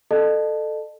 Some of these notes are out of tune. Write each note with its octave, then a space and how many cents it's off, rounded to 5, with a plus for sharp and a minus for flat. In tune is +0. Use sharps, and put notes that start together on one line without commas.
A4 +0 D#5 -40 A5 +0